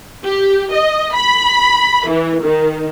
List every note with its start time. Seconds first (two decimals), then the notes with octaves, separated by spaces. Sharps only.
0.24 G4
0.73 D#5
1.14 B5
2.08 E3
2.42 D#3